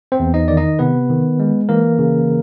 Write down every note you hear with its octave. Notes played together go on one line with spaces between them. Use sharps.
C4 C5
E2
D#4 D#5
D#3 D5
D#4 D#5
C3 B3 B4
D#3
G#3
E3 A#3 A#4
C#3